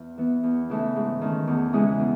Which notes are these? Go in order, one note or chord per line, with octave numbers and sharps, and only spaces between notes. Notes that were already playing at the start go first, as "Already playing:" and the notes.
Already playing: E2
E3 B3
E2
C#3 E3 A3 D#4
G#2
D#3 A3 C#4
E2
C#3 E3 G#3 C#4
B2